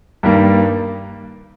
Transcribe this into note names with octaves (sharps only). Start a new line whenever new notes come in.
G2 D#3 G3 A#3